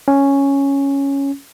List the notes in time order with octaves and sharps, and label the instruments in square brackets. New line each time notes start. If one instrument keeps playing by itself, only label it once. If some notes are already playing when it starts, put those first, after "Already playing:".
[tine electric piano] C#4